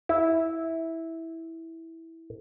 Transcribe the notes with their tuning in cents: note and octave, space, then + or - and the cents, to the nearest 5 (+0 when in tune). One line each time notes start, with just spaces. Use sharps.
E4 -10